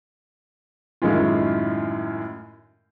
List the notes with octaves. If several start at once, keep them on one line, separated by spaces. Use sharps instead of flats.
F#2 A2 D#3 G#3 C#4 F4